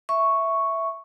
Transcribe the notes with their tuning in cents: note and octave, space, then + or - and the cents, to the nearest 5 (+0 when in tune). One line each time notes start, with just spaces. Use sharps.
E5 +0 C#6 +0